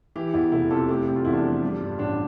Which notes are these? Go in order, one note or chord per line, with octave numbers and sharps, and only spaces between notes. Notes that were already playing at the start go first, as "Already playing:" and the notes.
E3 E4 G4
E2 E4
F1 E4
C3 F4 A4
A3 E4 G4
C3 G4
F4
E2 E4
D4 F4
F3
G3
G2
A1 D4